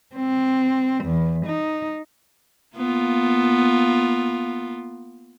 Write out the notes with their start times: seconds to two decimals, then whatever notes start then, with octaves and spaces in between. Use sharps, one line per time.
0.15 C4
1.04 E2
1.46 D#4
2.76 A#3 B3 F4